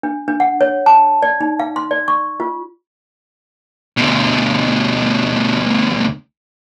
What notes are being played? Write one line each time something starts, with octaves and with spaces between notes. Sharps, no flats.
D4
D4
F#5
C#5
A5
D5
D#4
F5
C6
D5
C#6
F4
D2 B2